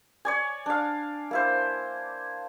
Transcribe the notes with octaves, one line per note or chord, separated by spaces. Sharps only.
C#5 D5 G#5
D4 F5
A#3 E4 C5